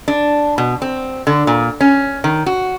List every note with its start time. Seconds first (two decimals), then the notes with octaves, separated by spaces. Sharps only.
0.08 D4
0.58 B2
0.82 C4
1.27 D3
1.47 A#2
1.81 C#4
2.24 D#3
2.46 F#4